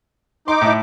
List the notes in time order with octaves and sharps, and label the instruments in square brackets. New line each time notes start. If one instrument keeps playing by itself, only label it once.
[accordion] D#4 D6 [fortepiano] C6
[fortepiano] A2 E4